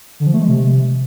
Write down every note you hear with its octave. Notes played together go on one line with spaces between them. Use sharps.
D3
F3
A3
G#3
C3